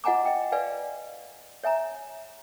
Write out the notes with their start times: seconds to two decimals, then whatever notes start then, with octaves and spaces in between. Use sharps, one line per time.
0.04 F4 D#5 F#5 G#5 A#5 D6
0.25 D#5 G5
0.52 B4 D5 F5 G#5
1.64 C#5 E5 G#5 A#5